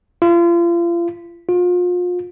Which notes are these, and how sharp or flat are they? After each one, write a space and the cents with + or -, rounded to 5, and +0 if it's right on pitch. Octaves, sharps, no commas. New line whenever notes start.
F4 -35
F4 +35